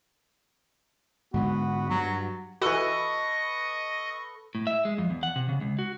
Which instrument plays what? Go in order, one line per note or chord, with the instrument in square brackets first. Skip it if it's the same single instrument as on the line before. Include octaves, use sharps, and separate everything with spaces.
[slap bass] G#2 D3 G#3 [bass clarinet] B3 [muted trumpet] F#4
[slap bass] G2 [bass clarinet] F#3
[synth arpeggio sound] E3 F#4 [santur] A4 B4 [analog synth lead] D#5 [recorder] C#6
[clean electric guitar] A2
E5
G#3
F2
E2
F#5
C3
C#3
C#2
F#4